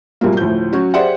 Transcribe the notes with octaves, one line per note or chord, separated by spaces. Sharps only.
C2 A#2 F#3 G3 A#3
D2 A2 F3 G6
F#3 C#4 F#4
G4 G#4 C5 D5 E5 F#5